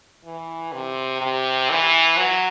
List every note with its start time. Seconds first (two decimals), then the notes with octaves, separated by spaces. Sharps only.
0.25 E3
0.73 C3
1.21 C3
1.70 E3
2.17 F#3